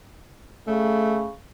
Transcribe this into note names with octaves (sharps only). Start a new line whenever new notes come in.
C#3 A3